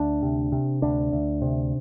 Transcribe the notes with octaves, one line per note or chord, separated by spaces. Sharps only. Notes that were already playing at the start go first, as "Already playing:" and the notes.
Already playing: D2 D4
C3
C3
D2 D4
D2
C3